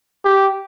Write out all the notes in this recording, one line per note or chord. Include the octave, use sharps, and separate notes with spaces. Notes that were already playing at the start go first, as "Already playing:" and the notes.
G4